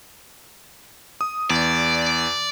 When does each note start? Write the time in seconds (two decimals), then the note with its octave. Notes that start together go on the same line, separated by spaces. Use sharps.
1.21 D#6
1.50 E2 D5